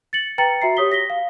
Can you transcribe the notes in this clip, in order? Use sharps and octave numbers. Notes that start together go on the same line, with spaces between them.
A6 C#7 F#7
B4 G5 A#5 A6 C#7 F#7
F#4 E5 A#5 C7
G4 C#5 D#6 B6 G7
A#6 B6 G7
F5